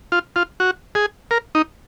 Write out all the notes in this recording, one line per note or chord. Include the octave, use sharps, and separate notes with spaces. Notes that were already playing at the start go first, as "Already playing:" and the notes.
F4
F4
F#4
G#4
A#4
D#4